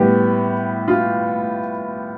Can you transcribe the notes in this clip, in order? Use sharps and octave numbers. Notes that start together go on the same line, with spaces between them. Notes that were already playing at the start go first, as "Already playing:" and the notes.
Already playing: A2 G3 B3 G4
F4